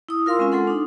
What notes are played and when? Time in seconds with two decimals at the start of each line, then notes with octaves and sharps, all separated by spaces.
0.09 E4 D#6
0.26 F4 A#4 F5 C6 E6
0.39 G#3 C4 C#4 F4
0.52 G#3 C4 F4 A4 F#5 C6
0.67 D4 D#4